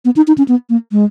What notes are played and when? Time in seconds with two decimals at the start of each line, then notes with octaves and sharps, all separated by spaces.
0.05 B3
0.16 D#4
0.28 D#4
0.38 C#4
0.48 B3
0.70 A#3
0.92 G#3